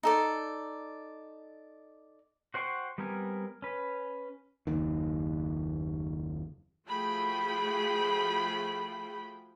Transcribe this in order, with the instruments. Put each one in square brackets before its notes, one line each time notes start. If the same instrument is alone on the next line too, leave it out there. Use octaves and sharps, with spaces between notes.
[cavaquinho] D#4 A4 D5
[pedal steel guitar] F#4 C5 F#5 G5 C#6
G3 B3 C4 A#4 G#5
C#4 B4
[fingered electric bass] F#1 D#2 D#3
[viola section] F3 A3 F#4 G#4 G5 B5